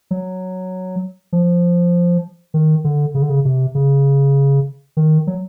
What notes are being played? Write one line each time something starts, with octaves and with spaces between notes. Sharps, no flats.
F#3
F3
D#3
D3
C#3
D3
C#3
C3
C#3
D#3
F#3